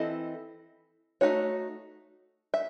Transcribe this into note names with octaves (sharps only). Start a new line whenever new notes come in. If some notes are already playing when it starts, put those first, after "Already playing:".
Already playing: E3 C4 E4 A4 D#5
A3 D#4 F#4 C#5
E5